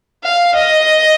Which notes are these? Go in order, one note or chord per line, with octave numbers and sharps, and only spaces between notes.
F5
D#5